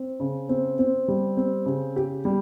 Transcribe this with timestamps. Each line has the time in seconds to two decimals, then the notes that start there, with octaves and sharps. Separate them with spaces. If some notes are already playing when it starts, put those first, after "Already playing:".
Already playing: C4
0.20 C#3
0.49 C4
0.79 C4
1.08 G3
1.37 C4
1.66 C#3
1.96 G4
2.25 G3